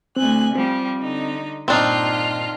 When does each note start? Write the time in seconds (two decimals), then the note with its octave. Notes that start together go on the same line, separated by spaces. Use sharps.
0.16 D2 C4 G#5 F#6
0.55 F3 G3 C4 G4
1.00 D3 D#4
1.68 G2 A#2 D#3 C4 D4 D#4 F4 F5